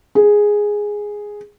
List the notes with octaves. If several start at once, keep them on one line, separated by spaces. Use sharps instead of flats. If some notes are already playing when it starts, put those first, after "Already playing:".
G#4